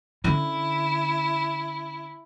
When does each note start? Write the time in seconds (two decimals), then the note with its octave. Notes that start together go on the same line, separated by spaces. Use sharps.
0.24 D3 C#4 E4